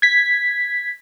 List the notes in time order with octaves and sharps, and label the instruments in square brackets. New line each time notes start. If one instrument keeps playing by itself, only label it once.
[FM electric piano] G#6 B6